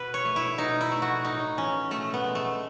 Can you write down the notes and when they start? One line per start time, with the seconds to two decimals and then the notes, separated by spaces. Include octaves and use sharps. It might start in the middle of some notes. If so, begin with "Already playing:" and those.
Already playing: B2 B4
0.14 C#5
0.25 A3
0.36 E4
0.58 B2 D#4
0.81 E4
0.92 A3
1.02 F#4
1.25 A2 D#4
1.57 E3 C#4
1.90 B2 A3
2.14 B3
2.24 G#3
2.35 A3